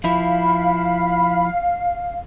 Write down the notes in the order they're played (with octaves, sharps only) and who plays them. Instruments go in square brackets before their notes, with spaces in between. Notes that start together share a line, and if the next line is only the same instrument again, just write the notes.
[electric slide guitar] F3 E4 [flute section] F5 [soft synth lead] B5